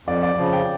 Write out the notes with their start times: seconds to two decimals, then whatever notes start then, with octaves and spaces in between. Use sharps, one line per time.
0.07 F2 D5
0.23 D5
0.37 C#3 F3
0.53 G5